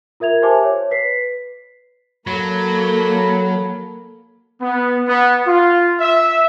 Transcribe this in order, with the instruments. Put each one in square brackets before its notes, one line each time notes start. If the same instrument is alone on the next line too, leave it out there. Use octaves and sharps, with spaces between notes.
[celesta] F4 A#4 E5 G#6 F7
G4 C5 E5 G#5 A5 D6
C#5
B4 B6 C7
[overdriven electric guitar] F#3 [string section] A#3 A4 [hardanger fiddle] B5
[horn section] B3
B3
F4
E5